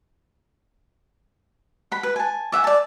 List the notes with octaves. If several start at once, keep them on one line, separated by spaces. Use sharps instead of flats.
F#5 B5
B4
G#5 A5
D5 E5 F#5 G#5
D5 A5